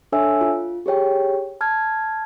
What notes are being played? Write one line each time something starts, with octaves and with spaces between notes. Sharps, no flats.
D4 A4 C#5 E5 G#5 E6
F4
G4 G#4 C#5 G5
A5 F6 G#6